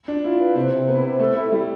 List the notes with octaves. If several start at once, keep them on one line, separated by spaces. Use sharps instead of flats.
D4 F4
E4 F4
B4
C3 C4
C3
B3 E4
C3
A3 A4
E4
G3 E4